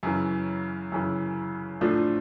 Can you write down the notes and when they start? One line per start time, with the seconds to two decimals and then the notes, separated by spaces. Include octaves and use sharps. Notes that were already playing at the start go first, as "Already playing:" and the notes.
0.03 F#2 C#3 E3
0.92 F#2 C#3 E3
1.81 A2 F3 A3 D4 F4